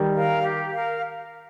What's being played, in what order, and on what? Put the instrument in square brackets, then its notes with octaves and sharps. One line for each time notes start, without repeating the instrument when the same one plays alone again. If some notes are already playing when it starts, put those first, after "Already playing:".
Already playing: [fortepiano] D#3 G3
[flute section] A#4 F5
G4
A#4 F5